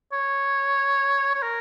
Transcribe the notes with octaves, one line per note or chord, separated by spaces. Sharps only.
C#5
C#5
A#4